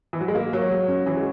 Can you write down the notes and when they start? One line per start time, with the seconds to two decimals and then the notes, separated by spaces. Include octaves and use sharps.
0.13 E3
0.21 F#3
0.28 G#3
0.35 A#3 F#4
0.53 F#3 C#5
0.71 G#3
0.89 C#4
1.06 E3 F#4
1.17 G#3